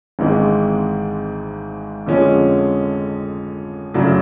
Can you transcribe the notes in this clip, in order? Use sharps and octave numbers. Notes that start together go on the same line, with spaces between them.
G#1 G#2 E3 G#3 C4
F2 D3 F3 G#3 C#4
F#2 C#3 F#3 A3 D4